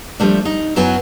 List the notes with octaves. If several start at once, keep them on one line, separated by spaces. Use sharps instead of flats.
F3 G3 A3 D4
D#4
F#2 F#3 B3 E4 G#5